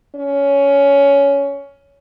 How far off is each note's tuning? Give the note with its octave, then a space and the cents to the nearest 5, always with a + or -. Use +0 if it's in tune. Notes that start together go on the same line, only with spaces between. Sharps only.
C#4 +15